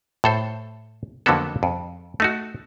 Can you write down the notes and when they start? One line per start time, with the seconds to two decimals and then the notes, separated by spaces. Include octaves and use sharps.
0.24 A2 A4 C5
1.26 F2 D3 F#3 A#3 B3 A4
1.63 F2
2.20 A3 D#4 F#4